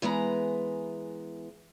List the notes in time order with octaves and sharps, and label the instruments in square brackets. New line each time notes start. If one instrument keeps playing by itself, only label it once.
[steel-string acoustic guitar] E3 G#3 B3 A#5